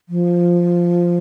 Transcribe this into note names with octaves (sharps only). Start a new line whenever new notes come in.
F3